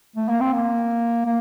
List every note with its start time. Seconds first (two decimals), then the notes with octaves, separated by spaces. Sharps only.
0.16 A3
0.29 A#3
0.41 C4
0.53 A#3
1.25 A#3